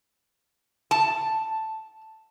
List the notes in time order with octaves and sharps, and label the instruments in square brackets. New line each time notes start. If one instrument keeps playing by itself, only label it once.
[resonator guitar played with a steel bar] A5